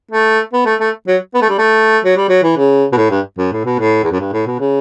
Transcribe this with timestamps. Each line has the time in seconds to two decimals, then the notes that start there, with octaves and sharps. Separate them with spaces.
0.11 A3
0.53 B3
0.65 A3
0.80 A3
1.07 F#3
1.34 B3
1.42 A3
1.49 G3
1.58 A3
2.05 F#3
2.16 G3
2.29 F#3
2.43 E3
2.57 C#3
2.92 B2
2.97 A2
3.10 G2
3.38 F#2
3.52 A2
3.65 B2
3.79 A2
4.03 E2
4.11 F#2
4.20 G2
4.33 A2
4.46 B2
4.60 C#3